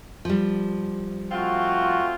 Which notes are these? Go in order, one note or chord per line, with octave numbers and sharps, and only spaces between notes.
F3 G3
A3 C4 F4 F#4